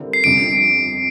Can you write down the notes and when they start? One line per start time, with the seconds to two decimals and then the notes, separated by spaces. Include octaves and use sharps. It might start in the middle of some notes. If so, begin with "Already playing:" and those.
Already playing: D3 G3 C4 E4 A#4
0.13 C7
0.24 G1 F2 C3 D7